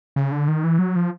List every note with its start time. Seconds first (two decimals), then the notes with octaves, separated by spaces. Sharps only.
0.16 C#3
0.32 D3
0.48 D#3
0.64 E3
0.79 F#3
0.96 F3